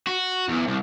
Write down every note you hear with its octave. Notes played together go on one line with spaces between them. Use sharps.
F#4
E2
C2